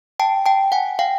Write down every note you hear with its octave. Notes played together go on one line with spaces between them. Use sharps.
G5 A5
G5 A5
F#5 G#5
F5 G5